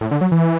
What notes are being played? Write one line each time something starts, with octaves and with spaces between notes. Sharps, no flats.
A2
D3
F#3
E3